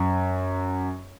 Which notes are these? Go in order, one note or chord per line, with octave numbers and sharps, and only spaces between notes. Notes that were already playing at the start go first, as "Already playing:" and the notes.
Already playing: F#2